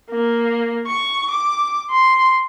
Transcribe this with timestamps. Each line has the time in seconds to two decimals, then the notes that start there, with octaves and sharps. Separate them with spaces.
0.10 A#3
0.87 C#6
1.30 D6
1.91 C6